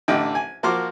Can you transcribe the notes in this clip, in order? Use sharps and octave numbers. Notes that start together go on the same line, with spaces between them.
A1 D3 D#5 G5
G#5
F3 A#3 F#4 C6 D6 F6